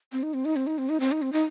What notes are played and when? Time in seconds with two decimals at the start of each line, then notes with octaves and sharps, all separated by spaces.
0.12 C4
0.23 D#4
0.34 C4
0.45 D#4
0.56 C4
0.67 D#4
0.78 C4
0.89 D#4
1.00 C4
1.12 D#4
1.22 C4
1.33 D#4